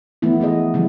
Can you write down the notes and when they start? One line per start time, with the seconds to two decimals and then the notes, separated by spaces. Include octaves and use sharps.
0.22 E3 F3 A3 B3 E4
0.40 E3 B3 G#4 D#5
0.74 C#3 E3 F3 G3 G#3 E4